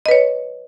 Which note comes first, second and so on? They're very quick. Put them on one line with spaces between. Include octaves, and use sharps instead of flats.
D#5 B4 C#5